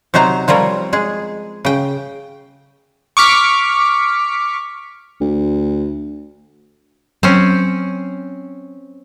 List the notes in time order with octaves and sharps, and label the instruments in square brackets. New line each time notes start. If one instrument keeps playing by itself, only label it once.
[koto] C3 F#3 D#4 C5 A#5
F3 G3 C4 A#4 C#5
G#3 G#4
C#3 G5
[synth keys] C#6 D6 F6 B6
[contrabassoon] D2
[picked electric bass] F#3 [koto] C4 C#4